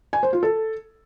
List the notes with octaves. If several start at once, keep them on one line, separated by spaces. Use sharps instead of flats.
G#5
C5
F4
A4